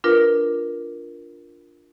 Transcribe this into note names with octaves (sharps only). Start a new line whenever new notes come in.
D4 F4 A#4 B4